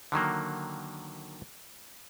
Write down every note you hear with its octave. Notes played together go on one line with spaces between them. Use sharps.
D3 D#3 F#3 A#3